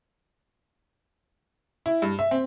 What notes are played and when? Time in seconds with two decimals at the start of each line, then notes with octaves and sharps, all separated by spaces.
1.86 E4
2.02 G2
2.19 E5
2.31 C4